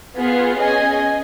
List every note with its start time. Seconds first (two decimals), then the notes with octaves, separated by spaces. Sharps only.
0.15 B3 F4 G#4
0.56 C#4 G#4 D#5 G#5